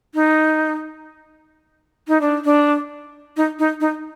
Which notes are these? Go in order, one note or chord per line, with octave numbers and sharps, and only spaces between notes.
D#4
D#4
D4
D4
D#4
D#4
D#4